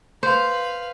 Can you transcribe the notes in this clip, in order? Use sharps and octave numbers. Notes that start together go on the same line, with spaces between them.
B4 C5 F5